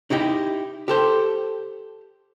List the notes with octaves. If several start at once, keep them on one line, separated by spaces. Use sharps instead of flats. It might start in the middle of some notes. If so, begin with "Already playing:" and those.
D#4 E4 G4 D#5
G4 A4 C5